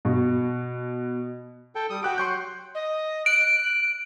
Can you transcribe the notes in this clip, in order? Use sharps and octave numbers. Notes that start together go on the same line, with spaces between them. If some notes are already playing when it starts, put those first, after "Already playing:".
B2
A4 G5
G3 D#6
F#4 G4 G5 F#6 D7
F#3 C6 C#6 G6
D#5
F#6 D7